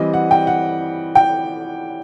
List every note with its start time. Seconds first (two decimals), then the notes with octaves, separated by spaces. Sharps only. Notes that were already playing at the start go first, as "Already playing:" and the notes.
Already playing: E3 G3 C4 D#5
0.14 F#5
0.31 G5
0.47 F#5
1.15 G5